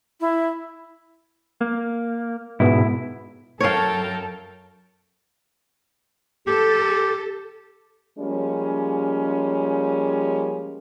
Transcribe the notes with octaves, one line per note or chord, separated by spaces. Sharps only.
E4
A#3
G#2 B2 B3 E4
F#2 A4 A#4 C#5 F5 G5 A5
G4 A4
F3 G3 G#3 A#3 C#4